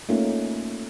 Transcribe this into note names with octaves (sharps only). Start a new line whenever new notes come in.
A3 A#3 C#4 D#4 F4